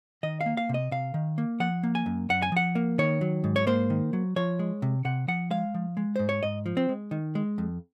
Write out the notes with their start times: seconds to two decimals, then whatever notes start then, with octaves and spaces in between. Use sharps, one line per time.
0.23 D#3 D#5
0.41 F5
0.46 A#3
0.57 F5
0.69 C3
0.74 D#5
0.91 C3 F5
1.14 D#3
1.38 A#3
1.60 F3 F#5
1.83 A#3
1.95 G#5
2.06 F#2
2.29 F#2 F#5
2.42 G#5
2.52 F3 F#5
2.75 A#3
2.98 D#3 C#5
3.21 F#3
3.44 G#2
3.56 C#5
3.67 A#3 C5
3.90 D#3
4.13 F#3
4.36 F3 C#5
4.59 G#3
4.82 C3
5.05 C3 F#5
5.28 F3 F#5
5.51 G#3 F5
5.74 F3
5.97 G#3
6.16 G#2 C5
6.29 C#5
6.43 G#2 D#5
6.66 F3
6.77 C4
6.89 G#3
7.11 D#3
7.35 G#3
7.58 F2